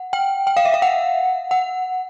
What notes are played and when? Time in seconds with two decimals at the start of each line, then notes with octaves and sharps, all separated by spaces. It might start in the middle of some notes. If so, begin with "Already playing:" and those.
Already playing: F#5
0.13 G5
0.47 G5
0.57 F5
0.65 E5
0.74 F5
0.82 F#5
1.51 F#5